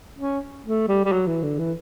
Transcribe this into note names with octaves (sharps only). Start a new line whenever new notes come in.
C#4
A3
G3
G3
F#3
E3
D3
E3